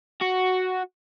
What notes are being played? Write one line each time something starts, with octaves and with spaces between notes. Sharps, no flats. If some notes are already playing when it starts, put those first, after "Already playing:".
F#4